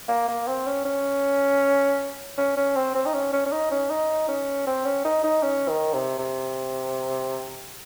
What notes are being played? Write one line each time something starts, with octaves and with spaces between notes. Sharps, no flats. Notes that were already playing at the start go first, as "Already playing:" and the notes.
A#3
A#3
C4
C#4
C#4
C#4
C#4
C4
C4
D#4
C#4
C#4
C#4
D#4
C#4
D#4
C#4
C4
C#4
D#4
D#4
C#4
D#3
C3
C3